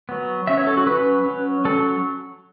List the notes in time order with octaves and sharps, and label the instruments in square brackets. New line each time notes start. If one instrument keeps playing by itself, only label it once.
[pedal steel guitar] F#3 B3
F#3 C#4 E5
C#5
A4
F#4
F#3 C#4 B4
F#3 C#4
F#3 C#4 A4